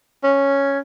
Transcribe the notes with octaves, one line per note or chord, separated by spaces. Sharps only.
C#4